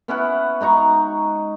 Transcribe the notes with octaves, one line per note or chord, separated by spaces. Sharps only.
B3 C#4 E4 F#5
G#2 D#4 A#5 C#6